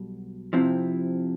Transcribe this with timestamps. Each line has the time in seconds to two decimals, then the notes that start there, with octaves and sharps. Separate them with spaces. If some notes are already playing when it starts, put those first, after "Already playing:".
Already playing: B1 B2 G3
0.53 C3 F3 C4 E4